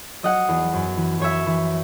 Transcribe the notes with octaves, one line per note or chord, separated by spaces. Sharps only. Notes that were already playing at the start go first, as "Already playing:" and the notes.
F#3 D#5 F#5
E2
F#2
E3
F#2 C#5 E5
E3